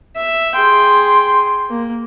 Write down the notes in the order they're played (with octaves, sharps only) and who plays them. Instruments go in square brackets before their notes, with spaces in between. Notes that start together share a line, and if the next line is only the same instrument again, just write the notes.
[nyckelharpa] E5
[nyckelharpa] G#4 G5 [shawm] C6
[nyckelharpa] A#3